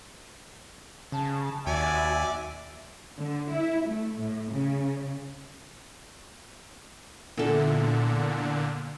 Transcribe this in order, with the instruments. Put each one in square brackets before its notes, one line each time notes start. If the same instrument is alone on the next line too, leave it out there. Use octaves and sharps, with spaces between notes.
[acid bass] C#3 [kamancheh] A5
[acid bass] D#2 [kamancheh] F#4 E5 [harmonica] D5 G#5
[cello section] D3
E4
A3
A2
C#3
[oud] E2 A4 [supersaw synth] A#2 D3